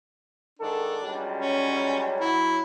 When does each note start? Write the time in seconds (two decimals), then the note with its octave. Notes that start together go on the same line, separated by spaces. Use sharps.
0.59 G#2 D#3 D4 A4
1.01 C#2 F#3 G3
1.38 C#4
2.21 F#3 E4